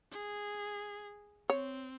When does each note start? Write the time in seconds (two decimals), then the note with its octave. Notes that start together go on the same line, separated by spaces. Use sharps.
0.12 G#4
1.50 C4 C#5